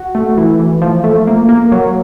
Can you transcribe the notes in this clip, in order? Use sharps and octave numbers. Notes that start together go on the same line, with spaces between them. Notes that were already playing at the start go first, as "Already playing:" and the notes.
Already playing: F#4
A3
E3
E3
F3
A3
A#3
A#3
F#3